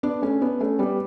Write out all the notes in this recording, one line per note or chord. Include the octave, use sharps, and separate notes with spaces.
B3 D4
A3 C#4
B3 D4
A3 C#4
G3 B3